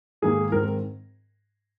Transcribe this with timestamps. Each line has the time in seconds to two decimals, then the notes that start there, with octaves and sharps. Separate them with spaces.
0.22 G#2 D#3 A#3 G#4
0.52 G#2 D#3 C4 A#4